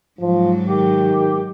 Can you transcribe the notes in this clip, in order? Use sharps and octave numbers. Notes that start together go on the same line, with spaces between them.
G#2 F3 F#3
D#3 G4